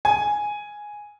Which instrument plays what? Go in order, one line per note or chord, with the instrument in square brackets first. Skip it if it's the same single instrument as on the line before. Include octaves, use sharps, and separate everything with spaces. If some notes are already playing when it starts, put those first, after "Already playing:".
[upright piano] G#5